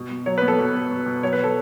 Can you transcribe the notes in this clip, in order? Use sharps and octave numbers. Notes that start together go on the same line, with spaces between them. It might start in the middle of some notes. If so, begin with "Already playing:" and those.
Already playing: B2
B2
F#3 C#5
B4
B3
A4
B2
B2
B2
B2
F#3 C#5
B4
A4